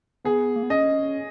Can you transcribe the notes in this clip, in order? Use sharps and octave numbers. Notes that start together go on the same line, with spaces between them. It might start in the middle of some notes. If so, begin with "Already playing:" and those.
B3 G#4
A#3
B3
C#4 D#5